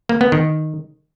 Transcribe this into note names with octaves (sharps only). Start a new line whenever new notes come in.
A#3
B3
D#3